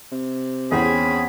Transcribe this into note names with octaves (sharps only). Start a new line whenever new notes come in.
C3
E2 C4 C#4 G#4 B5